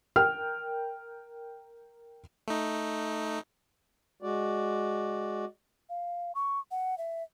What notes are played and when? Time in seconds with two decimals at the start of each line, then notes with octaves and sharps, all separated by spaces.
0.16 A#4 G5 F6
2.48 A3 D#4
4.22 G#3 F#4 D5
5.89 F5
6.35 C#6
6.71 F#5
6.98 E5